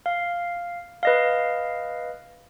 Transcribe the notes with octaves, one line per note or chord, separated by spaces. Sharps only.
F5
B4 D#5 F5